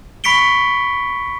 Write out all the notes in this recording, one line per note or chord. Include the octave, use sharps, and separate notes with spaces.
B5 C#6 B6 C#7 D7 G7